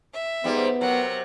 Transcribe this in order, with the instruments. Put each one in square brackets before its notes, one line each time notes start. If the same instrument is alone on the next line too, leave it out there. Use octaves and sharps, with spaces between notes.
[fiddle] E5
[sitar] G#2 G3 [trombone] B3
[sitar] C3 F#3 [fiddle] A#4 F#5